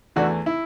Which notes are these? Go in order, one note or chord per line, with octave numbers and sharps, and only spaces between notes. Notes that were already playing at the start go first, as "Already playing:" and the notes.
E2 E3 A3 D4 F#4
E4